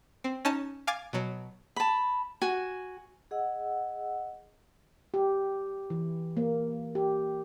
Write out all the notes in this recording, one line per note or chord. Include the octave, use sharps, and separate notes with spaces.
C4
C#4 D#4 A5
F5 G#5 D6 G#6 A6
B2 F#3
A5 B5
F#4 G#5
G#4 D#5 F#5 E6
G4
E3
A#3
G4